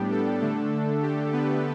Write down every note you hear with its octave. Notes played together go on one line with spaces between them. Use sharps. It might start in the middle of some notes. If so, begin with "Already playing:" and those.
Already playing: A2 G3 B3 D4 G4
A4
D3 A3 D4
G4
B3 B4